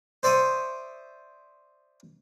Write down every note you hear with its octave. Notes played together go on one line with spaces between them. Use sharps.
C5 D5 E5 C#6 D#6